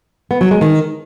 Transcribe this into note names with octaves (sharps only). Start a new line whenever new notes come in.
B3
F#3
G#3
D#3